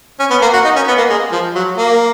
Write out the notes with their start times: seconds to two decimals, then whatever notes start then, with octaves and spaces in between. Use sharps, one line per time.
0.20 C#4
0.30 B3
0.42 A#3
0.53 F#4
0.64 D#4
0.76 C#4
0.88 B3
0.98 A#3
1.10 G#3
1.32 F3
1.55 F#3
1.77 A#3